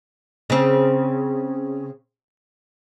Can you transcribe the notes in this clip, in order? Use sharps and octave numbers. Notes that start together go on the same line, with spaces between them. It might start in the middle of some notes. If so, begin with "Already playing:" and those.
C#3 C4